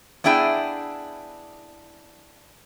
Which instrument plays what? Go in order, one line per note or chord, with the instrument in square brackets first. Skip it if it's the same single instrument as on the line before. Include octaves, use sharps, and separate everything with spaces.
[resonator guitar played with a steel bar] B3 D4 E4 G#4 G5